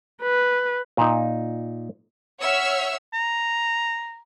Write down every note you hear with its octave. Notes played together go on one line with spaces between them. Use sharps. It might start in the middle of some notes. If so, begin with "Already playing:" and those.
B4
A#2 D#4
C#5 E5 F#5 E6 F6
A#5